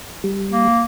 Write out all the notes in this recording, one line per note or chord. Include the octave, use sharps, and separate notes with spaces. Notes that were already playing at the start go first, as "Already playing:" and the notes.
G3
A#3